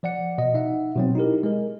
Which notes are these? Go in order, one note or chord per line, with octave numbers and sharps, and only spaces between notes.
F3 D5 F#5 C#7
B2 D#5
D#4 E5 F#5
B2 F#3 C4
D#4 E4 G4 A#4
G#3 A#4